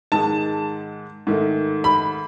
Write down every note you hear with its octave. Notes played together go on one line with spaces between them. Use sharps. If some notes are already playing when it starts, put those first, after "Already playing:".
G#2 D#3 G#3 A5
G#2 D#3 A3
B5